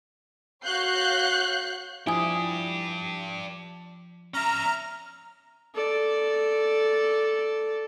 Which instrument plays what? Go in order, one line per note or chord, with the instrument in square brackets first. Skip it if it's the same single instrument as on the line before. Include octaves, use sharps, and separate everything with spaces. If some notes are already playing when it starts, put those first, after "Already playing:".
[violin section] F#4 C#5 F5 F#6 G6 C7
[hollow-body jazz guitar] F3 E4 [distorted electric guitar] D4 G4 [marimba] G#5 D#6
[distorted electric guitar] C#4 E5 [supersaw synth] A#5 F6
[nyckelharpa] A4 D5